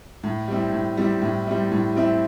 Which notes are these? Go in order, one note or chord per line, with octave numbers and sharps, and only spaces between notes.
A2
G3 C4 E4
A2
G3 C4 E4
A2
G3 C4 E4
A2
G3 C4 E4